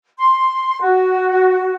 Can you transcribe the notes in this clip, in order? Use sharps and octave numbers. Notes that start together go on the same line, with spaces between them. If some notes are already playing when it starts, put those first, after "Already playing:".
C6
F#4